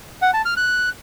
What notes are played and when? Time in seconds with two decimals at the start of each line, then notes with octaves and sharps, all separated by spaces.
0.22 F#5
0.34 A5
0.45 F6
0.57 F#6